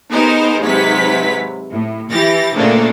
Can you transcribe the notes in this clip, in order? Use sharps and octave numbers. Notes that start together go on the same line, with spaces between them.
B3 D#4 G4 G#4 A#4 C5
G#2 C3 F#3 B4 B6
A2
E3 G4 A6 A#6
A#2 C#3 A3 A#3 C4 D4